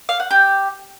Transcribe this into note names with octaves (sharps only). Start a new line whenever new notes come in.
F5
F#5
G4